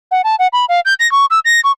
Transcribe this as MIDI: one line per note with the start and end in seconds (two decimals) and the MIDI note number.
0.11 0.22 78
0.24 0.35 81
0.39 0.47 78
0.53 0.65 83
0.69 0.80 77
0.85 0.94 91
1.00 1.10 94
1.12 1.25 85
1.30 1.39 88
1.45 1.60 94
1.64 1.72 85